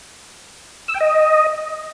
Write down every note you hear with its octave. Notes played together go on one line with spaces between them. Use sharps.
E6
G5
D#5